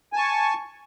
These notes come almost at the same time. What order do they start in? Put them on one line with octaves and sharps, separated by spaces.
G#5 A5 C#6